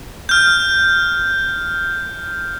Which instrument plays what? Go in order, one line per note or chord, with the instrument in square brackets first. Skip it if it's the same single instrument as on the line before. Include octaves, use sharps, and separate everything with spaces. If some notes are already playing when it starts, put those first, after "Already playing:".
[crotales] F6 G6